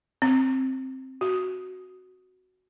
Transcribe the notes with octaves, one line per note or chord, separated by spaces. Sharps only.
C4
F#4